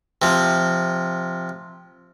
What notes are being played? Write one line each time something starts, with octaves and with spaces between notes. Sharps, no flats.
C3 F3